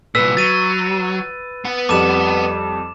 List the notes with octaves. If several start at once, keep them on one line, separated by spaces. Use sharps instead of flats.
C2 A#2 B4 E6 B6
F#3 A6 D#7
B3 F#5
F2 G3 D6 E7